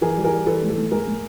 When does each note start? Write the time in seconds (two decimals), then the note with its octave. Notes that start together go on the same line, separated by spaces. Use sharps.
0.01 E3 G#4 A#4
0.17 G3
0.24 G#4 A#4
0.32 G3
0.46 E3 A4 B4
0.63 A2
0.70 A4
0.78 A2
0.92 A2 G#4 A#4
1.07 A2